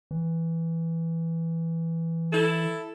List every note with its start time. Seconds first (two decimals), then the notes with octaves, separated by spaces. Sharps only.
0.11 E3
2.32 E4 A4